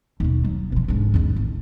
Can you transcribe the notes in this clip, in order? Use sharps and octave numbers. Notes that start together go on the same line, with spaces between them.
D#2 B2
F#3
B2 F3
G#2 D3
G#1 D#2
A1